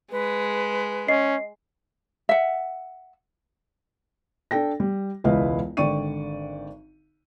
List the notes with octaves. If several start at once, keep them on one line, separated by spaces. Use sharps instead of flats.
G#3 B4
C#4 D#5 C7
E5 F#5
D4 A4 G5 A#6
G3
E1 C#2 E4 B4 D#5 F5
G#1 D3 D5 G5 C#6 D#7